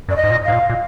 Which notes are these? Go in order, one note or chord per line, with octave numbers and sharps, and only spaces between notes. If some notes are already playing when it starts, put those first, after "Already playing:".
F#2 D5
D#5
G#2
A#2
G#2 F5
A#2
A#2